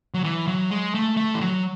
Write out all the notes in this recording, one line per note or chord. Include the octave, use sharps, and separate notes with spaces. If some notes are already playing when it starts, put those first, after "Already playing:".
F#3
E3
F#3
G#3
A3
A3
E3
F#3